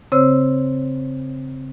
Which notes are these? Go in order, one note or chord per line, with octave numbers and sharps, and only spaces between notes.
C#3 C4 C5 C#5 E6